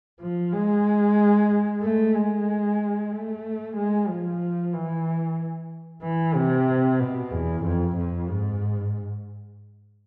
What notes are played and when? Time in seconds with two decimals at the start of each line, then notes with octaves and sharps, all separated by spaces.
0.21 F3
0.53 G#3
1.82 A3
2.14 G#3
3.11 A3
3.76 G#3
4.08 F3
4.73 E3
6.02 E3
6.35 C3
7.00 B2
7.31 E2
7.64 F2
7.97 F2
8.29 G#2